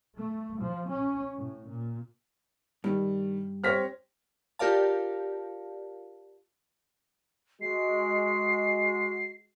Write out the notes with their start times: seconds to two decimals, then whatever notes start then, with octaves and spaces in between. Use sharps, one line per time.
0.19 A3
0.60 F3
0.89 C#4
1.35 A2
1.70 A#2
2.84 G2 D#3 G3
3.64 C4 G4 C#5 F6 A#6 B6
4.59 F4 G4 A#4 D5 F5 A5
7.62 G#3 F#4 C7